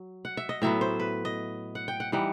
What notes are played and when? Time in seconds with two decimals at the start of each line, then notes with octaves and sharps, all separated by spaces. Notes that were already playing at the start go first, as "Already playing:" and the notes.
Already playing: F#3
0.25 F#5
0.37 E5
0.49 D#5
0.62 A2 F#3 B3 E5
0.81 C5
1.00 B4
1.25 D#5
1.75 F#5
1.88 G5
2.00 F#5
2.12 E3 G3 D#4 F#5